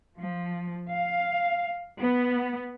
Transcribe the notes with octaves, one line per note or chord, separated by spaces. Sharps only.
F3
F5
B3